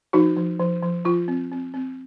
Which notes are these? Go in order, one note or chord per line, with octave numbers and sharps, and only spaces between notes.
F3 D#4 F#4
F3
F3
F3
F3 F4
C4
C4
C4